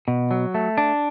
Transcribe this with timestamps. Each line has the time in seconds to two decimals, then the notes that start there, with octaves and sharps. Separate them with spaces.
0.08 B2
0.31 F#3
0.54 A3
0.78 D4